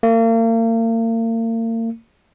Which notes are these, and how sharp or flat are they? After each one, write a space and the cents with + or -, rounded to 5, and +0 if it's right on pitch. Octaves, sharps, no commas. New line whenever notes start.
A#3 -40